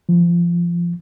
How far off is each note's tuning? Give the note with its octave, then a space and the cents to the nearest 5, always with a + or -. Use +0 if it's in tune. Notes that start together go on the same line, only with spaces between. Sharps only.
F3 -20